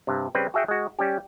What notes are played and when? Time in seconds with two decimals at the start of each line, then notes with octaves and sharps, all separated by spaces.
0.07 G2 C3
0.35 C#3 G3 C4 B4 G5
0.54 F#4 G#4 E5 F#5 G5
0.68 G#3 F#4
0.99 G3 C#4 G4